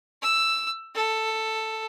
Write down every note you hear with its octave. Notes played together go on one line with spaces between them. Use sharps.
E6
A4